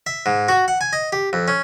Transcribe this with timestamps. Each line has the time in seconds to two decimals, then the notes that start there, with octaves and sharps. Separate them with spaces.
0.06 E5
0.26 G#2
0.49 F#4
0.68 F#5
0.81 G#5
0.93 D#5
1.12 G4
1.33 F2
1.48 C#4